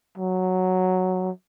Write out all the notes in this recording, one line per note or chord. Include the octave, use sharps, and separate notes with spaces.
F#3